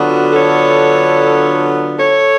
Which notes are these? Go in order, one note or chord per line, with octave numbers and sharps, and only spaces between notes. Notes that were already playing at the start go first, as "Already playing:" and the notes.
Already playing: D3 F#3 B3 D4 F4 F#4
A4 C#5
A4 C#5